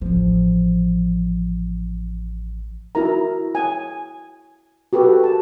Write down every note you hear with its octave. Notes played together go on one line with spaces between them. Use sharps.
A1 F3
E4 F#4 A#4 A#5
G#5
F#4 G4 A4 B4
A#4 A5